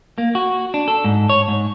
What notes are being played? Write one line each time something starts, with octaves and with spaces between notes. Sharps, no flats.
A#3
F#4
D4
A4
G#2
C#5
G#2